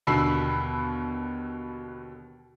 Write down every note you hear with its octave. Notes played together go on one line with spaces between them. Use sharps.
D#2 B2 D3 B5 E6 C7